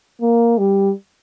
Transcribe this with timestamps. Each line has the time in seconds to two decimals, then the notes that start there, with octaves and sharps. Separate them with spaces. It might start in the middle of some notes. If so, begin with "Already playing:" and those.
0.21 A#3
0.58 G3